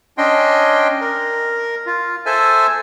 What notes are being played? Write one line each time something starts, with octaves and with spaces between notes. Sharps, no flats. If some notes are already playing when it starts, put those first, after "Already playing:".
C#4 D4 D#5 G5 C6
A#4
F4
A4 C5 E5 G#5